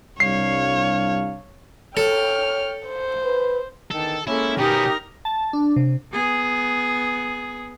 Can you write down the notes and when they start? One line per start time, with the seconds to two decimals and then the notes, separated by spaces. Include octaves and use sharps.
0.20 C2 G3 D4 C#5 F5 C7
1.97 A4 C#5 G5 F6
2.87 C5
3.25 B4
3.91 E2 D3 D#3 A4
4.27 G#3 A#3 C#4 E4 A4
4.58 B2 C#4 D#4 G4 A#4 A#5
5.25 A5
5.53 D4
5.76 C3
6.12 B3 G#4